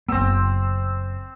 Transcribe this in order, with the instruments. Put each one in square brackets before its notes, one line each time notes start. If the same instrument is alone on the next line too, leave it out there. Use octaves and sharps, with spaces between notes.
[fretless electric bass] F#1 B3 [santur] C4 E6